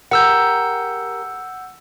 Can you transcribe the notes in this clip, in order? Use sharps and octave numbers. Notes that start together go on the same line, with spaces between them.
G4 G#4 A#4 F#5 E6 G6